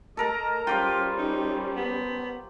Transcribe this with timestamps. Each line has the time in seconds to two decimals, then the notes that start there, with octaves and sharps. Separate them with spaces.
0.17 A3 A4 A#4 D#5 A5 A#5
0.67 G3 C#4 F4 G4 C5 G5
1.18 D#4
1.77 B3